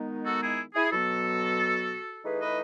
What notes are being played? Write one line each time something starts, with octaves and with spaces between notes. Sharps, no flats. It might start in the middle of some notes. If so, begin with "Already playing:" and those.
Already playing: D#3 G#3 B3 D#4
F#4 A4
E4 G#4
E4 G#4
B2 F#3 B3 F#4 A4
E3 A3 D#4 G#4 B4
B4 D#5